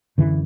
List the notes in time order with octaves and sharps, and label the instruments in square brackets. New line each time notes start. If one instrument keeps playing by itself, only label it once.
[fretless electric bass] F#2 D3 E3